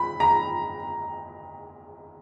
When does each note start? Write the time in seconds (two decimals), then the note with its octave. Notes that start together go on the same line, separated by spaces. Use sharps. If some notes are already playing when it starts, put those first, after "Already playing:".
Already playing: B5
0.20 A#5